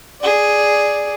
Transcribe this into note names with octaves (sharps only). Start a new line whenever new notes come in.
G#4 D5